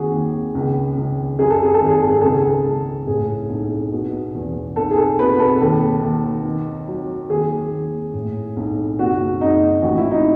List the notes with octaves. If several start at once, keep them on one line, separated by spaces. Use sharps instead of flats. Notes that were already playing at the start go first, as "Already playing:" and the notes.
Already playing: D#2 F#4 G#4
D#2
C#2
C#2
F#2 G#4
A4
G#4
A4
G#1
G#4
A4
G#4
C#2 A4
G#4
C#2
A2 G#4
B1
B2
E2
B1 A4
G#4
A4
B2 B4
A4
D#2 A4
D#2
D#3
F#3
D#2 G#4
D#2
A2
B1
F#1 F#4
F#1 D#4
A1 F#4
E4
D#4